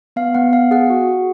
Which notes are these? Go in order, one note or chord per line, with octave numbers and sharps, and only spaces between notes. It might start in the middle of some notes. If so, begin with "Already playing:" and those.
B3 F5
B3 F#5
B3 F5
G#4 F#5
F#4
F#4